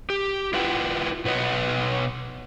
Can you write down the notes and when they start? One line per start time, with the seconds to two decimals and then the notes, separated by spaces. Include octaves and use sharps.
0.10 G4
0.53 E4 F4 B4 F#5 G5
1.25 B2 B4 C#5 D#5 F#5